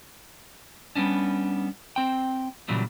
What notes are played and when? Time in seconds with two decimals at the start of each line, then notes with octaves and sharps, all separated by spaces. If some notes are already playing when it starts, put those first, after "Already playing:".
0.95 G3 B3 C#4 D4
1.96 C4 G5
2.68 A#2 C#3 E3 F#3 G3 A3